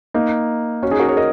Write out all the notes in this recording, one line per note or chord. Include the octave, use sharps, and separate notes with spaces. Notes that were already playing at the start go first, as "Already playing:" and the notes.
A#3 D#4
C#4 F#4
D#4 G#4
F#4 A#4
G#4 C#5
A#4 D#5